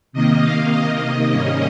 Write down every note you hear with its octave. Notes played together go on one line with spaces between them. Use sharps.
C3 D#3 A#3 D#5
F5
D#5
G#2 G3 A#3 C#4